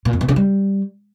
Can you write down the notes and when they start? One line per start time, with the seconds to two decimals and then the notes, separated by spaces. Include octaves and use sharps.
0.05 A#2
0.13 F2
0.21 B2
0.29 C#3
0.36 G3